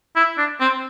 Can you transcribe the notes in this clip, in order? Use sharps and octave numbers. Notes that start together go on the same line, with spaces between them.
E4
D4
C4